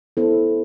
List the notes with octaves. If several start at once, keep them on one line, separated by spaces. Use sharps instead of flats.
B3 E4 A4 C5